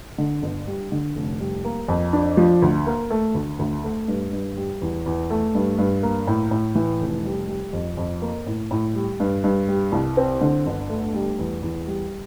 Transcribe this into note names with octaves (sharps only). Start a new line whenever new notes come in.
D3
G1
G3
D3
F1
G3
A#3
F2
D4
F3
D2
A#3
A3
D2
D2
A3
G2
G2
G3
E2
E2
A3
G2
G2
A#3
A2
A2
E3
F1
G3
G3
F2
F2
A#3
A2
A2
G3
G2
G2
G3
C2
C4
D3
G1
A3
G3
E2
E2
G3